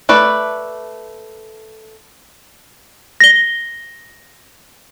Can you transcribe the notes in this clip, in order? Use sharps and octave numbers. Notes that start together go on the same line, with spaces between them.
A3 B4 D5
A#6 G7